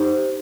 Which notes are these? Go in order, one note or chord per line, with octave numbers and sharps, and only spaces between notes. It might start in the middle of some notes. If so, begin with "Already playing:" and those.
Already playing: D#4 G4 C5